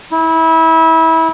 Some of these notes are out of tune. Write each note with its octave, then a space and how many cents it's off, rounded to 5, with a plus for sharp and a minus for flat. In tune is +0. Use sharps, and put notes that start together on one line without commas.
E4 -25